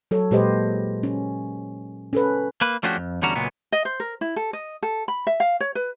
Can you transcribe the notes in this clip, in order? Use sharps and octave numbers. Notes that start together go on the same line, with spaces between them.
F#3 A4 C#5
A#2 G#3 G4 B4 C5 D#5
C#4
C#4 A4 B4
A#3 B4
F3 A3 C#4 D4 F#4 G4
F2
E2 D3 G3 C#4 F#4 A#5
C#2 A#2 F#3 G#3 B3
D#5
C5
A#4
E4
A4
D#5
A4
B5
E5
F5
C#5
B4